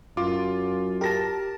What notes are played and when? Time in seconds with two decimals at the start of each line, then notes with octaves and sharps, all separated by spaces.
0.17 F#2 F4 D6
1.01 G4 A#4 A5 A#6